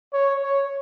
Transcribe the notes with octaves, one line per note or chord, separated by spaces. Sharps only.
C#5
C#5